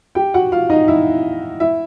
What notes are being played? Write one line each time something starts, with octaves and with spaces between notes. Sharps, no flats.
G4 G5
F#4 F#5
F4 F5
D#4 D#5
E4 E5
E4 E5